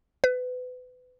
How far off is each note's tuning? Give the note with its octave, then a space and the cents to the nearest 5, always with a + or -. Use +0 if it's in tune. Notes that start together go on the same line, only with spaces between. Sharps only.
B4 +30